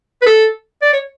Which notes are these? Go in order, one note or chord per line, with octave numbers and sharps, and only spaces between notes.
B4
A4
D5
C#5